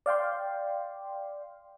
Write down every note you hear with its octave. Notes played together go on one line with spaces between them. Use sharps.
D5 F5 G5 C6